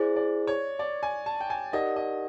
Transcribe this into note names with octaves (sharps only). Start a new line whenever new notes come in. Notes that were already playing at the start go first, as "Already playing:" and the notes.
Already playing: E4 G#4 C5 D5
D5
C#5
D5
G#5
A5
G5
G#5
D#4 G4 A#4 D5 D#5 F#5
D#5